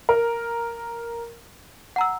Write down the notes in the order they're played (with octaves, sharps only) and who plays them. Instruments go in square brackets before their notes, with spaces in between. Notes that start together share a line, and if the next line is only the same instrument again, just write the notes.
[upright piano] A#4
[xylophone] F#5 A#5 E6